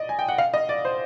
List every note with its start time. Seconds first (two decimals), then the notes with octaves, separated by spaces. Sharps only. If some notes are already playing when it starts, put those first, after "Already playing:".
Already playing: D5 D#5
0.09 G#5
0.19 G5
0.28 F#5
0.38 F5
0.54 D#5
0.69 D5
0.85 C5